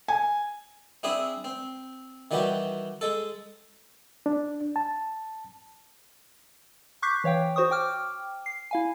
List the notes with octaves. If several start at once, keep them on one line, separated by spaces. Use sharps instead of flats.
G#5
C4 D4 E4 G#4 E5 D#6
C4
D#3 E3 G3 F#4 G4
G#3 A4
D4
A5
C#6 D6 F#6 G6 B6 C7
E3 C#5 F5 G5
F#4 C5 C#6 D#6
G5 D6 F6
C7
E4 F5 G#5